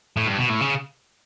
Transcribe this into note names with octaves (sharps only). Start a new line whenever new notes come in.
A2
G2
B2
A2
C#3